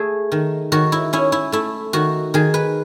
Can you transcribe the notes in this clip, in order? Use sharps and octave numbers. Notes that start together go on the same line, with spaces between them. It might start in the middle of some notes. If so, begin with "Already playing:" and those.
Already playing: A3 G#4
D#3
D#3 F#4
E4
C#4 E4
E4
A3 E4
D#3 F#4
D#3 G#4
B4